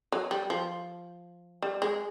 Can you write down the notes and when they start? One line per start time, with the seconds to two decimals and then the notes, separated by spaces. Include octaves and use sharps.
0.12 F#3
0.31 G3
0.50 F3
1.62 G3
1.82 G#3